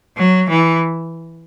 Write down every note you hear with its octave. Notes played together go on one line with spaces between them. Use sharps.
F#3
E3